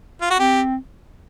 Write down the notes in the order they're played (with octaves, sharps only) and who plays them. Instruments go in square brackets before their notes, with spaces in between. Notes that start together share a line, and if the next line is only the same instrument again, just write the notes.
[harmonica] F4
F#4
[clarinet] C4 [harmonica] G4